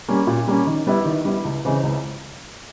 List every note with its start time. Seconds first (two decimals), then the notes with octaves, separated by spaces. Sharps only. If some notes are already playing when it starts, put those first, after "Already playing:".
0.09 G3 A#3 C#4
0.27 A#2
0.47 G3 A#3 C#4
0.67 D#3
0.87 G3 B3 E4
1.05 D#3
1.25 G3 B3 E4
1.45 C#2
1.65 C#3 E3 G#3 C4
1.83 C#2